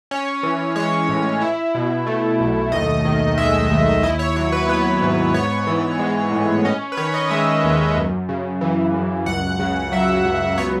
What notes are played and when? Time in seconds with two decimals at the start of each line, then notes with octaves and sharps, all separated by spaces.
0.11 C#4 C#5
0.43 E3
0.76 G#3 C#5
1.09 A2
1.41 E4
1.75 B2
2.06 A3
2.40 B1
2.72 D#2 D#5
3.05 D#3
3.38 G#3 E5
3.70 D#2
4.03 E4 D#5
4.19 C#5
4.36 F#3 C#5
4.52 B4
4.69 B3 B4
5.02 G#2
5.34 B3 C#5
5.67 E3
5.99 G#3
6.32 A2
6.65 C#4 D#5
6.92 B4
6.97 D#3 C#5
7.14 D#5
7.30 G#3 E5
7.64 D#2
7.96 F#2
8.29 C#3
8.61 E3
8.94 F#2
9.26 C#2 F#5
9.59 C#3
9.92 F#3 E5
10.24 C#2
10.57 B3 C#5